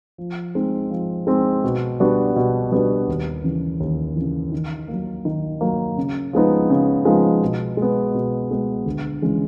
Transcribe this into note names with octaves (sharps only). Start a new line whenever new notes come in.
F3
G#3 C4 D#4
F3
G#3 C4 D#4
B2
G3 B3 D4 F#4
B2
G3 B3 D4 F#4
D#2
C#3 E3
D#2
C#3 E3
D#3
F#3 A#3
D#3
F#3 A#3
C#3
F3 G#3 B3 D#4
C#3
F3 G#3 B3 D#4
B2
G#3
B3
B2
G#3 B3
D2
C#3 E3 G#3